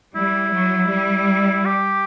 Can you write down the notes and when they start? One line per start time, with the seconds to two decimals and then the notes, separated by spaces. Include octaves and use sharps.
0.15 G3 E4
0.53 F#3
0.90 G3
1.65 G4